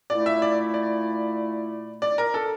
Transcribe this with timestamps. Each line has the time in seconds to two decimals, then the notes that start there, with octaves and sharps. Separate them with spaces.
0.10 A#2 A3 E4 D5
0.26 E5
0.42 D5
0.74 D5
2.02 D5
2.18 A#4
2.34 A4